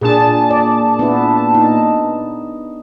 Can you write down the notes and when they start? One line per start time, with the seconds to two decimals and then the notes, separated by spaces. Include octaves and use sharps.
0.01 A#2 D4 G#4 A5
0.50 D5
0.99 B3 D4 E4
1.54 D#4